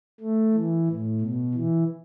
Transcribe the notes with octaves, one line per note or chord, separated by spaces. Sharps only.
A3
E3
A2
B2
E3